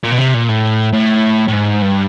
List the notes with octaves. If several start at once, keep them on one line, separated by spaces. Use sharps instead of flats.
A#2
B2
C3
A#2
A2
A2
A2
G#2
G2